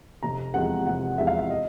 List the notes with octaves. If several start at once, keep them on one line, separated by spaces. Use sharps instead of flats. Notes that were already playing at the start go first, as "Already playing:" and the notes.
F1 A#5
E2 C3 F3 G#3 F#5
F1 F#5
E2 C3 F3 G#3 E5
F5
E5
D#5